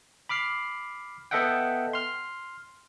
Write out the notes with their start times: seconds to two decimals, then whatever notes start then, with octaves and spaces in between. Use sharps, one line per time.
0.29 B5 D6 F6 C7
1.31 B3 A4 D#5 E5 F#5 G5
1.93 C6 F6